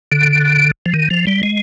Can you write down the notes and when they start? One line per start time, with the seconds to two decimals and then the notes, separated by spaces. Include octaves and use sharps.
0.12 D3
0.86 F3
0.94 D#3
1.10 F3
1.27 G3
1.43 G#3